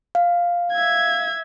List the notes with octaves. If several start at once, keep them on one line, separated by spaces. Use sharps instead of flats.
F5
E5 G#6